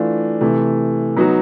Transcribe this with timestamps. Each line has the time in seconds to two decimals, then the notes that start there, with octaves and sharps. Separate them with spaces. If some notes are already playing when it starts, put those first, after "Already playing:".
Already playing: E3 A3 D4 F4
0.41 C3 E3 A3
1.17 F#3 B3 D#4 F#4